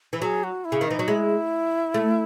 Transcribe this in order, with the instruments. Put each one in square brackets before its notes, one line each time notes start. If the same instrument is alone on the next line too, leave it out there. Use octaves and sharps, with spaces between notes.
[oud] E3
[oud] F#3 [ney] G#4
[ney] F#4
E4
[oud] C#3
D#3
[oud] E3 [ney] D#4
[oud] F#3
[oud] G#3 [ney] E4
[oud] A3